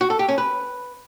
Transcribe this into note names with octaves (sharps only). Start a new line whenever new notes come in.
F#4
A4
G4
C#4
B4